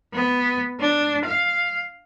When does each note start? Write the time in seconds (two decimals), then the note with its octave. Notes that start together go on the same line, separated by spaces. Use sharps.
0.13 B3
0.80 D4
1.25 F5